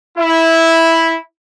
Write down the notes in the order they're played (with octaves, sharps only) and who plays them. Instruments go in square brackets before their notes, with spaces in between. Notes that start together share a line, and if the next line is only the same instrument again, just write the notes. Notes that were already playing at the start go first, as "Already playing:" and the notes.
[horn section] E4